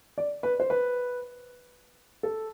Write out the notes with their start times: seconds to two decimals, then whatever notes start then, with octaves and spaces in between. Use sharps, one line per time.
0.18 D5
0.43 B4
0.60 C5
0.70 B4
2.23 A4